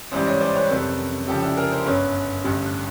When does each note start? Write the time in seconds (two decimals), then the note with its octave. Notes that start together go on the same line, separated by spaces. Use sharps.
0.11 A1 G#2 E3 G3 C5 D5
0.27 C#5 D#5
0.40 C5 D5
0.55 B4 C#5
0.69 F2 C3 D#3 F#3 A4 B4
1.28 C#2 C#3 F3 G4 A4
1.42 D4 E4
1.57 G#4 A#4
1.72 A#4 C5
1.86 G1 F#2 D3 B4 C#5
2.44 A1 G2 D3